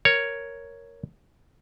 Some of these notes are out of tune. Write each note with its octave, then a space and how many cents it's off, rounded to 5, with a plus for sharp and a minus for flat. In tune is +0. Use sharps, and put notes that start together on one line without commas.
A#4 +0 C#5 +0